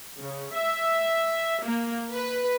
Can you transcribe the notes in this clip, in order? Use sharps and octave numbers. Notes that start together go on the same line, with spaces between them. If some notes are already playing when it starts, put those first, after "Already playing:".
C#3
E5
A#3
B4